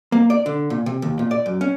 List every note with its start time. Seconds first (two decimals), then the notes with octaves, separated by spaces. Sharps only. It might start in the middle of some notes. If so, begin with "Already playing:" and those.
0.12 A#3
0.30 D5
0.46 D3
0.70 A#2
0.86 C3
1.02 D#2
1.19 A#2
1.31 D5
1.46 F#2
1.61 C#4